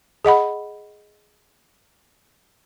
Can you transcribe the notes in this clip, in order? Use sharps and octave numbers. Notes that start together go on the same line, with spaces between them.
G#4 D#5 F#5 B5